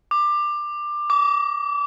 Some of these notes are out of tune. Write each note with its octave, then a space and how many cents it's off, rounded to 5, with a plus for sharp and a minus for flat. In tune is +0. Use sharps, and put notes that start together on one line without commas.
D6 +20
D6 -30